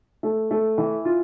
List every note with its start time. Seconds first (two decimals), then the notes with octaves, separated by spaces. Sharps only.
0.23 A3
0.51 A3
0.78 E3
1.05 F4